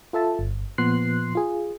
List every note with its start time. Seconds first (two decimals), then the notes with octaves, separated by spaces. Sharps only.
0.13 F4 A4 E5 A5
0.39 G1
0.78 A#2 F3 B3 C6 F#6 C7
1.35 F4 G#4